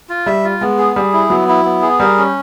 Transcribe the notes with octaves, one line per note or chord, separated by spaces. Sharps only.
F4
G3 E5
F4
G#3 B3
G#4
G3 G#4
E4
F#3 B3
E4
B3
G#4
G3 A#4
C#4